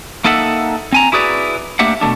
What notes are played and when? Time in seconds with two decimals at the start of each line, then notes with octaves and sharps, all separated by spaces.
0.24 A#3 D#4 A4 E5 F#5
0.92 C4 G#5 A#5
1.12 E4 F#4 G#4 B4 D5
1.79 A3 A#3 D4 G4 E5 F#5
2.01 B2 E3 A3 D4